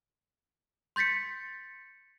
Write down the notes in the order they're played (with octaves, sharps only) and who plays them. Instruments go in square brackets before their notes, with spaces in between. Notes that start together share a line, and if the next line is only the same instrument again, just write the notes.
[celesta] C6 G6 A6 B6 C#7